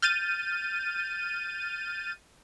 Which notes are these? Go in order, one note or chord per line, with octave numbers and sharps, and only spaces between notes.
F6 G6 A6 D#7